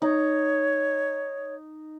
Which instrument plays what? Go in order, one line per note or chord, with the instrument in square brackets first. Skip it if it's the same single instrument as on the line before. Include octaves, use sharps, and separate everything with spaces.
[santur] D#4 [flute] C#5